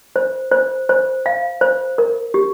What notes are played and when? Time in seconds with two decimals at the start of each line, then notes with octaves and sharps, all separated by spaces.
0.16 C5
0.52 C5
0.89 C5
1.26 F5
1.61 C5
1.98 A#4
2.34 G4